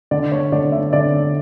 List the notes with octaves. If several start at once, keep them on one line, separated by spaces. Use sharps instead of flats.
D3 D5
C#5
D3 D5
E5
D3 D5